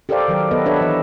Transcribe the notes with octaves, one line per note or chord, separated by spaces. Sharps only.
G4 A4 A#4 C5 D5 F5
D#3 F#3 A#4
B3 A4 B4 D#5
D4 G4 A4 B4 C#5 E5
E3 D#5